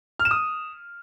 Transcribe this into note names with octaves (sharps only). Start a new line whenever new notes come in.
F6
E7
D#6